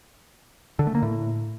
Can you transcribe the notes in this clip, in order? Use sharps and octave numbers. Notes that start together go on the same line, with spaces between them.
D3
A3
A#3
A2